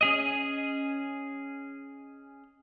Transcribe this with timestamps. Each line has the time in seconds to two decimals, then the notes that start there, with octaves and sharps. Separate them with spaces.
0.01 C#4 G#4 D#5